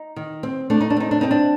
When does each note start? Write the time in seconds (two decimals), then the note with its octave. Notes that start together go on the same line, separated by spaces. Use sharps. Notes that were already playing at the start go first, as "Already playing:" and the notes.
Already playing: D#4
0.16 D#3
0.43 C4
0.70 A3 D4
0.81 D#4
0.90 D4
0.97 C4 D#4
1.11 D4
1.21 C4 D#4
1.31 D4